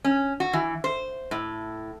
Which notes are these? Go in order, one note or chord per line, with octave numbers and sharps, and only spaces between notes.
C#4
F#4
E3
C5
A2